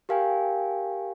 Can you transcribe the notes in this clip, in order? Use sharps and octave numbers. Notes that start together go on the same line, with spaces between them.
G4 A#4 F5 G5 G#5